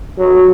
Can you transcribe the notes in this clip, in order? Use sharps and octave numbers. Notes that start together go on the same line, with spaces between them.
F#3